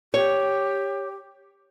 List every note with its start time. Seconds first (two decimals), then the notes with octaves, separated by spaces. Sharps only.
0.14 G4 C#5